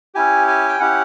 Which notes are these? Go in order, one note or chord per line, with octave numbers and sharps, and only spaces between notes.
C#4 E4 G4 G#5
G#5
G5
C#4 E4 G4 F#5